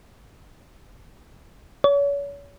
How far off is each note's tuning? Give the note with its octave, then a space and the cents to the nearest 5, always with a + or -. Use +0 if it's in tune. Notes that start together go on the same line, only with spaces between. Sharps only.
C#5 +35